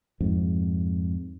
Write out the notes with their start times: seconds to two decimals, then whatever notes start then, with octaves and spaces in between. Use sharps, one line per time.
0.21 F2 G#2